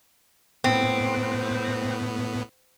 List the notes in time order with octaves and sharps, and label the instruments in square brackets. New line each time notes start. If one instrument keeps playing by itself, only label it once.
[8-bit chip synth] A2 B3 [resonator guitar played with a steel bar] C4